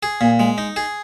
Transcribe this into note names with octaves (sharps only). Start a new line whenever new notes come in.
G#4
A#2
G#3
D#4
G#4